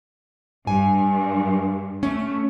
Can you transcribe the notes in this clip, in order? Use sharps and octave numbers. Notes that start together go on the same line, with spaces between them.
G2 G#5
A3 C#4